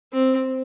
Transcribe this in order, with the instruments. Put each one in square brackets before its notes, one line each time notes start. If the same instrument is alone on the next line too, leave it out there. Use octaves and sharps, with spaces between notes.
[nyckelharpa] C4